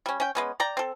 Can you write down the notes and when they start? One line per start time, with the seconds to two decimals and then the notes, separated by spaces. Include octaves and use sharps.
0.06 G3 C#4
0.20 C#4 G5
0.35 G#3 B3 C#4
0.60 D5 G5 A#5
0.77 C4 A4